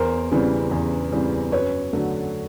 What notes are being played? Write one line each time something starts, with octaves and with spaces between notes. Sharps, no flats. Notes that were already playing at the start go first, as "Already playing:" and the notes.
Already playing: E2 A#4 C5
C#3 E3 G3 C4
E2
C#3 E3 G3 C4
F#2 B4 C#5
D3 F#3 A3